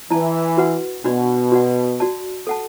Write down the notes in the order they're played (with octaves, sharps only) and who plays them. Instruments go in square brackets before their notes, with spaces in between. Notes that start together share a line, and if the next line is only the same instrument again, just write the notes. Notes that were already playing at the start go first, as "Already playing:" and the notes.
[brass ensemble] E3 [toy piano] E4 D5 A5
[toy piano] F#4 B4 F#5
[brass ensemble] B2 [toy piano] D4 F#4 D5 B5
[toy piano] F#4 D5 F#5
F#4 D5 A5
A4 F#5 A5